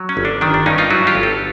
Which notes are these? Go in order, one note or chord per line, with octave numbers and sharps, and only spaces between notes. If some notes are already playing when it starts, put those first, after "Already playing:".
Already playing: F#3
C#4
G1
D4
D#3 D4
D4
G2 C#4 D#4
D#4 F4
F#3 E4 F#4
F4 G4
G1
G4 A4